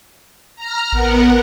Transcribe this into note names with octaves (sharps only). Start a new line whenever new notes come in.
A#5 F6
A1 B3 A#4 F#5